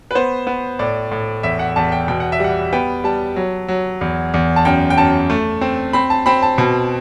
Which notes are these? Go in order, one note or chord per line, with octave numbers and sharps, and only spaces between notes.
B4
B3 C5
B3
A2 D5
A2
E2 E5
F#5
E2 A5
G5
B2 G5
F#5
E5
G3 F#5
B3 G5
G3 A5
F#3
F#3
E2
E2
A5
F#2 G5
G5
F#2 A5
A3
C4
C4 B5
A5
C4 B5
A5
B2